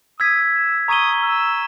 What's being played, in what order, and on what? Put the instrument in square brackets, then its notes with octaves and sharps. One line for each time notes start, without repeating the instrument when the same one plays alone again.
[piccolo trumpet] D#6 [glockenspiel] E6 G#6 B6
[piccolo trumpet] E6
[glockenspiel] A#5 C#6 G#6 D#7 G7 [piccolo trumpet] D#6
[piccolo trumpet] E6